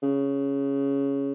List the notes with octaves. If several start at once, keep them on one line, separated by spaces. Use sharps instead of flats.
C#3